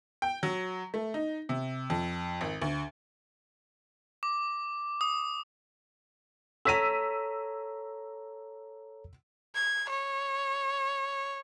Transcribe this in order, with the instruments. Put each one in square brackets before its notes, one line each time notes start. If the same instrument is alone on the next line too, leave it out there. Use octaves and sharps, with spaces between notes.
[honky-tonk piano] G5
F#3
A3
D#4
C3
F2
G#1
D2
[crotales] D6
D#6
[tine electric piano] A4 C#5 A#5 [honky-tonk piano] E6 B6 D#7
[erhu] G#6
C#5